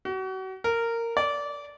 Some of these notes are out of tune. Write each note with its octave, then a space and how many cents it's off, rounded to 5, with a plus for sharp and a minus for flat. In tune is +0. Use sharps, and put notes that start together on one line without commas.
F#4 +35
A#4 -15
D5 -20